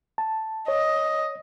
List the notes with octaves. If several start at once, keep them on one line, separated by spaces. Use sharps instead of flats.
A5
C#5 D#5